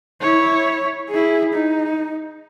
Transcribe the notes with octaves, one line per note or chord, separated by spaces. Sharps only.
E4 C#5
E4 G#4
D#4